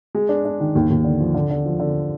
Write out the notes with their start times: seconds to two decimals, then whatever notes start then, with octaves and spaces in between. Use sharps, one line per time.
0.15 G#3
0.29 D4
0.45 D4
0.60 D#3
0.75 D#2
0.90 D#2
1.04 D3
1.20 F3
1.34 D3
1.50 D3
1.66 F3
1.80 D3